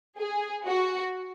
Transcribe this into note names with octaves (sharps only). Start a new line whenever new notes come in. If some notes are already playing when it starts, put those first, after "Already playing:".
G#4
F#4